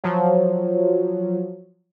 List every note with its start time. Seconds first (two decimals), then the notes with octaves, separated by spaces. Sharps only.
0.04 F3 F#3